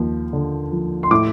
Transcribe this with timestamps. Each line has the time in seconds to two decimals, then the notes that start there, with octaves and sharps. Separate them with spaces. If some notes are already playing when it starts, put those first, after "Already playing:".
Already playing: D#2 F3
0.33 D3
0.72 F3
1.03 C6
1.11 A2 D6